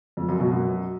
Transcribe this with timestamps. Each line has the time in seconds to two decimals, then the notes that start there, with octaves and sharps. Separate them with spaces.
0.17 F2
0.28 F#2
0.40 B2
0.51 F#2